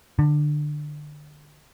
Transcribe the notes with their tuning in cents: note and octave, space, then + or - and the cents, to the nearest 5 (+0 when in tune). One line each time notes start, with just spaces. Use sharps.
D3 +20